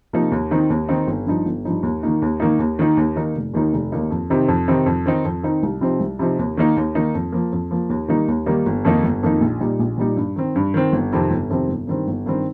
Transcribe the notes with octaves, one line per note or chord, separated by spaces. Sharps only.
C3 F3 A#3 D#4
D#2
D#3 C4 D#4
D#2
D#3 C4 D#4
G1
G2 F3 D#4
G1
G2 F3 D#4
D#2
D#3 A#3 D#4
D#2
D#3 A#3 D#4
D#2
D#3 A#3 D#4
D#2
D#3 A#3 D#4
F1
D#2 D#3 A#3 D#4
F1
D#2 D#3 A#3 D#4
F2
C3 D#3 C4 D#4
F2
C3 D#3 C4 D#4
F2
D#3 C4 D#4
F2
D#3 C4 D#4
C2
C3 F3 C4 D#4
C2
C3 F3 C4 D#4
D#2
D#3 A#3 D#4
D#2
D#3 A#3 D#4
F2
F3 A#3
F2
F3 A#3
D#2
D#3 G3 A#3 D#4
D#2
D#3 G3 A#3 D#4
G1
F2 D#3 A#3 D#4
G1
F2 D#3 A#3 D#4
A#1
A#2 G3 D#4
A#1
A#2 G3 D#4
G2
D#3 C4
G2
D#3 C4
G1
F2 C3 D#3 C4
G1
F2 C3 D#3 C4
G1
G2 D#3 C4
G1
G2 D#3 C4